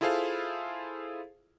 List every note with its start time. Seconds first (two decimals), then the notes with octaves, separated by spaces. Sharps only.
0.01 E4 F4 G#4 A4 C5 F5